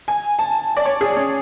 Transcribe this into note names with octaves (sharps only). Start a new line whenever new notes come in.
G#5
A5
D5
C#5
G#4
C#4